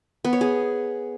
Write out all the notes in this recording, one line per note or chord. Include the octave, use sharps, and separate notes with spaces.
B3
C#5
G#4